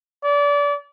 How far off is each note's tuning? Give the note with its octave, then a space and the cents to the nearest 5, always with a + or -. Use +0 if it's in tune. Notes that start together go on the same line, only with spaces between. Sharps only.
D5 -30